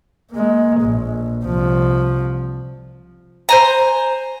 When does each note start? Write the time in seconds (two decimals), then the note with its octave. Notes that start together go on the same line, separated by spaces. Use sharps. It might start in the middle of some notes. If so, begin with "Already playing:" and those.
0.32 G#3 A#3
0.81 A#1
1.45 C2 F3
3.49 C5 G#5 A#5